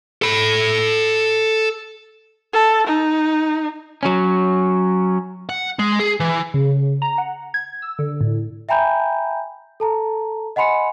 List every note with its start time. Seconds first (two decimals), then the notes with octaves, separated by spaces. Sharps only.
0.22 A4 B5
2.54 A4
2.87 D#4
4.03 F#3 C#4
5.49 F#5
5.79 G#3
5.99 G#4
6.20 E3
6.54 C#3
7.02 A#5
7.18 F#5
7.54 G#6
7.82 E6
7.99 D3
8.21 A2
8.69 E5 G5 G#5 A#5 B5 G6
9.80 A4 A5 A#5
10.56 D#5 F#5 G#5 B5 C6 C#7